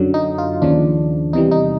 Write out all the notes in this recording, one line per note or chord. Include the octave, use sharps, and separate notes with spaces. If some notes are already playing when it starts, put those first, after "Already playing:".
Already playing: F#2 D3 F#3
D#4
F4
D#2 C#3 F3 D4
E2 C3 E3 G3 D#4
D#4